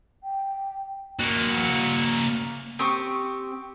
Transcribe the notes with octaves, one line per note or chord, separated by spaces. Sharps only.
G5
A#3 F#4
C4 G4 C#6 D#6